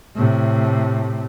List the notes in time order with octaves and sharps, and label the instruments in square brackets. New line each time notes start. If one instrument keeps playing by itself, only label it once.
[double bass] A2 C3